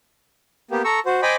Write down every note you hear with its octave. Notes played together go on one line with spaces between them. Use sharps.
A#3 B3 G4
A4 A#5 C#6 E6
F#4 C5
C5 D#5 G5 G#5 B5 D6